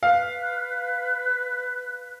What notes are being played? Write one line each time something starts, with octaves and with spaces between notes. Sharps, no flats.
B4 F5